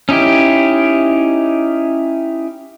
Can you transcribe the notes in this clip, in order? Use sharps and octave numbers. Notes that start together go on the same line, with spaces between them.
C#4 D#4 E4 G4